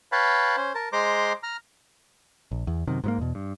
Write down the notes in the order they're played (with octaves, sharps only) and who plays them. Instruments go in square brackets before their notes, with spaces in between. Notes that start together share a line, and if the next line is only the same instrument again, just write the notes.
[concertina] B4 C#5 F5 G5 A5 B5
C#4 C5
A#4 A5
G#3 C5 A#5 C6 D6
A#5 F6
[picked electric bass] A#1
E2
F#2 C3 D#3
G#2 F3 A#3
E2 B2
G2